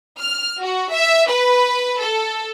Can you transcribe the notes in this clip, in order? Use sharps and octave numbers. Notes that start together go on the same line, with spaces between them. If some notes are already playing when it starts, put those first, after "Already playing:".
F6
F#4
E5
B4
A4